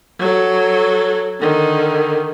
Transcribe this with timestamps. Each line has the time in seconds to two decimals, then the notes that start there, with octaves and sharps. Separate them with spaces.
0.19 F#3 A4
1.40 D3 D#3